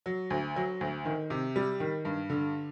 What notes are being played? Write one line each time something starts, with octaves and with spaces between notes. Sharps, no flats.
F#3
D2
F#3
D2
D#3
C3
G3
D#3
G2
D3